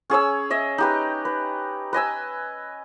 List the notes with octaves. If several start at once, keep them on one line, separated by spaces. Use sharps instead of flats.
C#4 G#4 C#5 E6
D#5 E5
D#4 G4 B4
B4
B4 D#5 G#5 E6